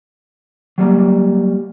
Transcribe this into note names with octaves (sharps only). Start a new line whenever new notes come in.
F#3 G3 A#3